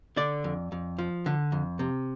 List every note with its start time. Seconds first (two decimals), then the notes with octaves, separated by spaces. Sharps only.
0.16 D3 D5
0.44 F2
0.72 F2
0.99 F3
1.26 D3
1.52 F2
1.79 C3